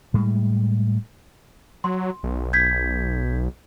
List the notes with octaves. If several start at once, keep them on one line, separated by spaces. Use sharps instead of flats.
A2 G3 G#3
F#3 C6
B1
G6 G#6 B6